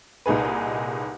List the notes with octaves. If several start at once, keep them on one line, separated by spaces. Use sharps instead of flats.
C2 A#2 D#4 G#4 B4